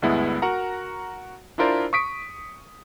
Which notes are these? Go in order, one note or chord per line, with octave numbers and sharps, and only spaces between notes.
D2 G2 G#3 B3 E4
F#4 A#4 F#5 A#5
D4 E4 F4 A#4 C5 D5
C#6 D#6 B6 D7